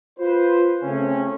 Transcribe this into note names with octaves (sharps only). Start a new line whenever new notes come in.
F4 B4 C5
C#3 A3 C4 C#4